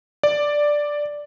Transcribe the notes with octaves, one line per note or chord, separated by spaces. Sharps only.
D5